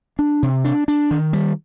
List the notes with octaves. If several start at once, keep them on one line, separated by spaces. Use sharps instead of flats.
D4
C3
D4
D4
D#3
G3